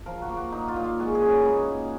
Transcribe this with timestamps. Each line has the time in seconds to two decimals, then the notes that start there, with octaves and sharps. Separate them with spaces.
0.06 F3 A#4
0.22 F#4
0.29 A#3
0.37 F#4
0.52 A#2 D#4
0.68 F4
0.76 A#2
0.84 F4
1.00 G#3 F#4
1.15 G#4
1.22 C#4
1.30 B4
1.45 A#2 D#4
1.68 A#2